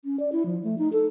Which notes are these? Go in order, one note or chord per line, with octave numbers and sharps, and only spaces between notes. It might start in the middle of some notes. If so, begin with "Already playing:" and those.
C#4
D5
E4
F3
A3
D#4
A4